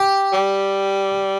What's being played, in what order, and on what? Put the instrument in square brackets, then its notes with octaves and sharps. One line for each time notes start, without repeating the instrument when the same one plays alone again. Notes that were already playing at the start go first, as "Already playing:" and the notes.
Already playing: [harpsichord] G4
[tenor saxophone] G3